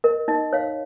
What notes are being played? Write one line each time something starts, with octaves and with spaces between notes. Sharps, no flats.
A#4 D#5
D#4 D#5
C#5 F5